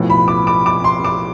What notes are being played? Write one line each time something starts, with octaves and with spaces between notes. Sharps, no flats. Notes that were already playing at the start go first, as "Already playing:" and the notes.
Already playing: B1 A2 F3 B3
B5
D6
D6
D6
C6
D6